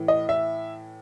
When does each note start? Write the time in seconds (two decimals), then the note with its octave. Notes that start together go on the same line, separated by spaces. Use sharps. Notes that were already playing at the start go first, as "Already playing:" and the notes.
Already playing: A2 E3
0.08 D#5
0.29 E5